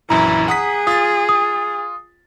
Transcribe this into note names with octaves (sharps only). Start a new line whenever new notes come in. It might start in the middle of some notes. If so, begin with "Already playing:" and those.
A#1 F#2 E3 E4 A#5
G#4 F#5 D#6 B6
F4 D#6 A6
D#6